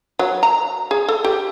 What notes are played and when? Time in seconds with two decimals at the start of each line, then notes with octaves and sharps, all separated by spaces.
0.19 F#3
0.43 A#5
0.91 G#4
1.08 A4
1.24 G4